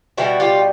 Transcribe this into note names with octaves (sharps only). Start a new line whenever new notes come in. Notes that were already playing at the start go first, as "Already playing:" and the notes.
B2 G3 E4 F#4
F4 G4